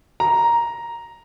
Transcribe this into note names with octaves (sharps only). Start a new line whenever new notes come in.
A#5